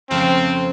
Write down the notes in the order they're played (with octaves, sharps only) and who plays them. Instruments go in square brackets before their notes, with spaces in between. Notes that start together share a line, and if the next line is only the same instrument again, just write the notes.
[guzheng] F2 C#3 F3 A3 [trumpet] C4